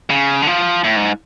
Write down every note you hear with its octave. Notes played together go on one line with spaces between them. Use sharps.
C#3
D3
F3
A2
G#2